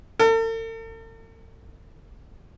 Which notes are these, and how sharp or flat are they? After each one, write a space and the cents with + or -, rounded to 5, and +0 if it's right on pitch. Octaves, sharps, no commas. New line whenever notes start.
A4 +45